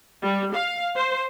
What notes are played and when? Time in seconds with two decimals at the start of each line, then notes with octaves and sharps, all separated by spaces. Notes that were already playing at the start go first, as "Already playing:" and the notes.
0.22 G3
0.54 F5
0.96 C5